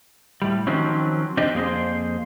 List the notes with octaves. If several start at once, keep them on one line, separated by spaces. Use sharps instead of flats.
A2 G3
D#3 F3 F#3 C4 C#4
C4 D4 G4 C5 D#5
F2 A#3 G#4 C5